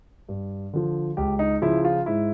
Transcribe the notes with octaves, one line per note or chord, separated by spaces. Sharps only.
G2
D3 F3
C#2 G4
D#4
C#3 F3 E4
F4
G#2 E4